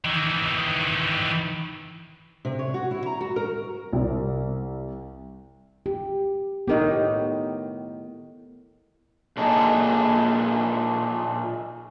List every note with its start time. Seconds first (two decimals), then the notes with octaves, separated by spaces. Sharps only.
0.05 D#3 E3
2.45 C3
2.59 C#5
2.74 F#4
2.91 E4
3.06 A#5
3.21 F#4
3.36 A#4
3.93 C2
5.86 G4
6.67 A2 D#3 B3 G4 A#4 D#5
9.37 A#2 D4 D#4 G#4 A4